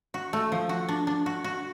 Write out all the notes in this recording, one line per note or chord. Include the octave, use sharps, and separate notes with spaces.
F#4
A3
F3
F#4
D4
D4
F#4
F#4